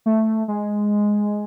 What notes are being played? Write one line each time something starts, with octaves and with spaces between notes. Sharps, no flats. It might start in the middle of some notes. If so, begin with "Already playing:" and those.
A3
G#3